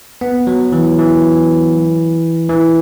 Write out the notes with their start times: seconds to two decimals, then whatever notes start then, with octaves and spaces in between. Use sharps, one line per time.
0.21 B3
0.47 F#3
0.72 E3
0.98 E3
2.49 E3